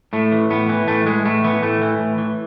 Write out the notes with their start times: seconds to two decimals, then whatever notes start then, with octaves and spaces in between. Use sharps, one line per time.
0.13 A2 A3
0.32 E3
0.50 A2 B3
0.69 E3
0.88 A2 A3
1.06 E3 G#3
1.25 A2 A3
1.44 E3 B3
1.62 A2 A3
1.82 E3
2.00 A2
2.18 E3